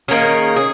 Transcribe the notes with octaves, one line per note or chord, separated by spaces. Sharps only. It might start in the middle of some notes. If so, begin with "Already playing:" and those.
D#3 A#3 C#4 G#4
G#4